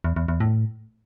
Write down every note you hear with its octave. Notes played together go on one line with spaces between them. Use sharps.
E2
E2
E2
A2